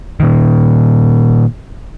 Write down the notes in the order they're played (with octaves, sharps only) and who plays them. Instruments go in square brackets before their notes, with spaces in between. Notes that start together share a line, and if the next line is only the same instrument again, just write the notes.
[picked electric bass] A#2 D#3